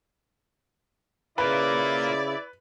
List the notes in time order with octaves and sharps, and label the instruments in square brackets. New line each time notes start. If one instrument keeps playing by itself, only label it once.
[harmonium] C#3 [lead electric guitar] A#3 F4 [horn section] E4 D5 [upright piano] B4